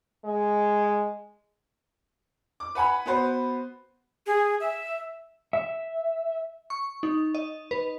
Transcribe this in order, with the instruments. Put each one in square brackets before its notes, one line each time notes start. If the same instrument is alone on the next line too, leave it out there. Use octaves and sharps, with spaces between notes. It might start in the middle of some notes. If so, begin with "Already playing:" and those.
[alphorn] G#3
[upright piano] D6
B4 F#5 G#5 B5
B3 F#4 B4 C5
[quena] G#4
E5
[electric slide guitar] E5
[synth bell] C#6
D#4
D#5
B4